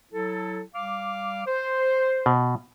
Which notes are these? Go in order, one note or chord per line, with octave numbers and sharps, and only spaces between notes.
F#3 E4 A4
G3 F5 D6
C5
B2